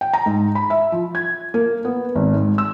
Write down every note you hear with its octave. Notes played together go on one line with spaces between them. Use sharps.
G5
A#5
G#2
B5
E5
F3
G#6
A#3
B3
G#1
G#2
E6